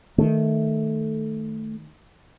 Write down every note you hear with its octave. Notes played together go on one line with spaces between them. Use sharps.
D#3 A3